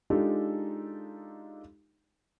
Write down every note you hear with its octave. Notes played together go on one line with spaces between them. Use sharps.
G#3 D4 D#4 F4 G4 A4